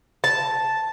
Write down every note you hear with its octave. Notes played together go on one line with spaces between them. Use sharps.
A5